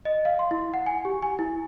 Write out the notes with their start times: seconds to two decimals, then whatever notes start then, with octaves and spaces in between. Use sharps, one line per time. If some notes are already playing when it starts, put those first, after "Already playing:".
0.05 D#5
0.25 F5
0.39 C6
0.51 E4
0.74 F#5
0.86 G#5
1.05 G4
1.22 G#5
1.39 E4